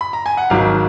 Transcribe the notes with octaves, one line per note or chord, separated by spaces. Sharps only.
B5
A#5
G#5
F#5
G#1 G#2 F#3 F5